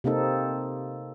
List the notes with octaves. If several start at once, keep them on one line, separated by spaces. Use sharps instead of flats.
C3 A#3 C4 D#4 A4